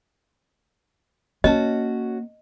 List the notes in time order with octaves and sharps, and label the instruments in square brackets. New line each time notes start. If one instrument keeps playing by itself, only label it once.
[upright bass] A#3 [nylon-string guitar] C#4 F#4 A5 [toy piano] D#5